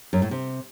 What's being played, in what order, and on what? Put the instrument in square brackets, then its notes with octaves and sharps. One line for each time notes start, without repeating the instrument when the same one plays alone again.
[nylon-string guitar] F#2
A2
C3